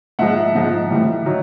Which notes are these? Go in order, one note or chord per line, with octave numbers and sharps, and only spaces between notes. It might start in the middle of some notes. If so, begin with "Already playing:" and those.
G#2 F3 G#3 E5 F#5
G#2 F3 G#3
A2 E3 G3
D#3 F#3